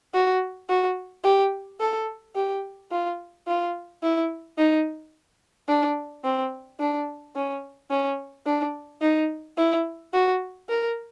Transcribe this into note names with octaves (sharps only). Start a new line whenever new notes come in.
F#4
F#4
G4
A4
G4
F4
F4
E4
D#4
D4
C4
D4
C#4
C#4
D4
D#4
E4
F#4
A#4